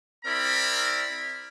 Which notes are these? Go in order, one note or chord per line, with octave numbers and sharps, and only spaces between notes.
C4 E4 A#4 D5 B5